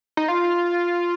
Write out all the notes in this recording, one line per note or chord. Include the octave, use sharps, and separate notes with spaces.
D#4
F4